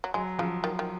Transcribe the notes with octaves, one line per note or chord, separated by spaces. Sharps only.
F#3
F#3 G#3
C#3 F3
D#3 F#3
D#3